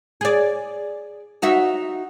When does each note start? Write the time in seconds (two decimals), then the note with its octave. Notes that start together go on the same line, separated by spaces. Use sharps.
0.21 G#4 D5
1.42 D#4 F#4 E5